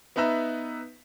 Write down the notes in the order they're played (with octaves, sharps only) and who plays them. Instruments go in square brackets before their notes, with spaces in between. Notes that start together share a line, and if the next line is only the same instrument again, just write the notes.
[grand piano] B3 D#4 B4 E5 A#5 E6